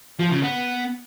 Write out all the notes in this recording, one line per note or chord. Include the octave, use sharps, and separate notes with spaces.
F3
C#3
B3